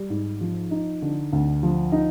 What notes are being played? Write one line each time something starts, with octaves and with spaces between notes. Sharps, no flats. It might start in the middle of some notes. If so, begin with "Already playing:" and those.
Already playing: G3
G#2
F3
D#4
D3
D2
F3
D#4